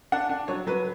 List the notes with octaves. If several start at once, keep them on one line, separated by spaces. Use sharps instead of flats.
D4 F#5
D4
F#3 C#5
F#3 B4